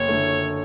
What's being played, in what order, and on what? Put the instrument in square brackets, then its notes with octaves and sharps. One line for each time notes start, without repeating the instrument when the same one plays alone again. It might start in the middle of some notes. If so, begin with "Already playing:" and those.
Already playing: [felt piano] F#1 [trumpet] C#5
[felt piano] D3 A3